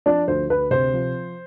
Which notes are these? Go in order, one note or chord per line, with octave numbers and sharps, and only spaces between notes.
F3 D4 D5
D2 C5
D2 B4
C3 C5
F3